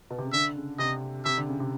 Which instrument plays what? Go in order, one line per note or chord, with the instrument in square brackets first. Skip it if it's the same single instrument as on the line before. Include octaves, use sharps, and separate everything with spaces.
[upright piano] B2
C3
C#3
[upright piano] D3 [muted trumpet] E5
[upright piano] C#3
[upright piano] C3 [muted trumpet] D#5
[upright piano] C3 [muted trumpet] E5
[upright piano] D3
C#3
C3